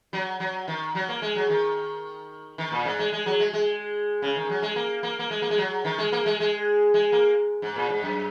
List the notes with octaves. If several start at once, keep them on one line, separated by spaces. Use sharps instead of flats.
F#3
F#3
D#3
F#3
A#3
G#3
F#3
D#3
D#3
A#2
G#2
G#3
G#3
F#3
G#3
G#3
C#3
D#3
F#3
G#3
A#3
A#3
A#3
G#3
A#3
G#3
F#3
D#3
G#3
A#3
G#3
G#3
G#3
A#3
G#2
A#2
G#2
F#2